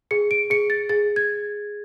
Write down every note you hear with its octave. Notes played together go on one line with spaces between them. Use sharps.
G#4 C#7
D7
G#4 C#7
A6
G#4 A6
G#6